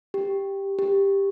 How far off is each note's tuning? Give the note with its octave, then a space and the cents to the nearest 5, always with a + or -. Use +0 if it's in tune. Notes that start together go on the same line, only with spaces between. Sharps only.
G4 +5
G4 +10